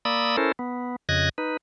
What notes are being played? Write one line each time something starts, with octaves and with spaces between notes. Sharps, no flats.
A#3 D5 B5 D#6 E6
C#4 E4 A4 A#4 C5
B3
F2 C#3 D#5 F#6 G#6 A#6
D#4 B4